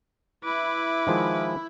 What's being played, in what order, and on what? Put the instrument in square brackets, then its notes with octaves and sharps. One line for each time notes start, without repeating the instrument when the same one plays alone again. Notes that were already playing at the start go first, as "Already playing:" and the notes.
[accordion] E4 [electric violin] B4 D6
[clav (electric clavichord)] D#3 F3 G#3